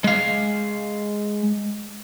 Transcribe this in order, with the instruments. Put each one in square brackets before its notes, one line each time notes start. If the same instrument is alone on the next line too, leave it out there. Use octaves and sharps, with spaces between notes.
[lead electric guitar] G#3 F5